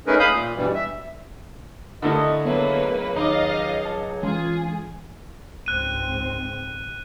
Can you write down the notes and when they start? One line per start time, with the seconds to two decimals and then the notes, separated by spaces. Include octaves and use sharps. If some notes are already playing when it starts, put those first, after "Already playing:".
0.07 A3 C#4 D#4 G#4 A#4 B4
0.20 F5 B5 D#6 G6
0.31 A#2
0.55 G2 B2 E3 G3
0.75 E5
2.02 D3 A3 E4 A#4 D#5
2.45 C#2 F#3 A#3 B3 B4 C#5 E5
3.16 D#2 D#4 C#5 D#5 F5 D6 A6
3.85 A5
4.23 E3 G#3 C#4 F4 G#4
5.66 C#2 G#2 C4 F#6 D#7